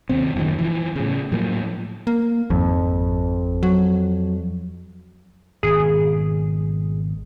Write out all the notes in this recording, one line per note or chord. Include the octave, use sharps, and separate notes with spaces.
D#2 C3 C4
F#1 C#2 A#2 D#3
E3 F3
A2 C#3
A2 F3 F#3 A#3
A#3
G#1 F2
F#3
G#1 B2 G#4